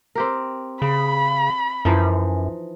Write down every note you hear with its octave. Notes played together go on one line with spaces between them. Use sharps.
C4 G4 A#4
C#3 B5
F#2 E3 F3 D#4